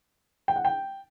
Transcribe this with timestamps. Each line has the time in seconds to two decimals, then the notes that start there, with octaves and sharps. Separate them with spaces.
0.48 G5
0.56 F#5
0.65 G5